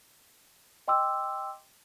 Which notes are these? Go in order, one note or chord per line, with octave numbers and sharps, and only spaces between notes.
D#5 G5 C6 D6 E6